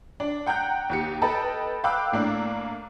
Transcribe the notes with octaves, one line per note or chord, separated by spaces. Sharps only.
D4
F#5 G5 A#5 F#6 G6
D#2 G4 C#7
A4 B4 D#5 G5 A5 B5
F5 G5 B5 D6 E6 F#6
A2 A#3 D4